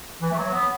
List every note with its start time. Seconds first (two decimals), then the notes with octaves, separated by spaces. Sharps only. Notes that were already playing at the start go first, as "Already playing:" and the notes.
0.21 E3
0.31 A3
0.37 F#3
0.52 B3